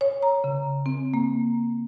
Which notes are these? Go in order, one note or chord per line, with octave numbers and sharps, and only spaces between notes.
C#5
A#5
C#3
C4
A#3